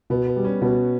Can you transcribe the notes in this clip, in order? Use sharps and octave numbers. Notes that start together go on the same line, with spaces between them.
B2 B3
B3
G3
C#4
B2 B3